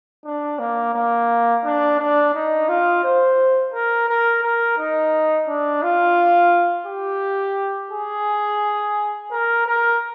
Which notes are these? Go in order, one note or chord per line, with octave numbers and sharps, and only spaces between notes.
D4
A#3
A#3
D4
D4
D#4
F4
C5
A#4
A#4
A#4
D#4
D4
F4
G4
G#4
A#4
A#4